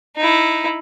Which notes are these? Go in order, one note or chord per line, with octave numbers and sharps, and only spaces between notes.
D#4 E4